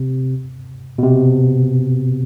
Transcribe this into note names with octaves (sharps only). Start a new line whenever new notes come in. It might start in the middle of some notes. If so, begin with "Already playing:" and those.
Already playing: C3
B2
C3